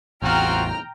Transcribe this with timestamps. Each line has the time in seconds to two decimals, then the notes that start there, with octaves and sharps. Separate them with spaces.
0.22 A1 E2 C4 F4 F#4 G5 A#5 F6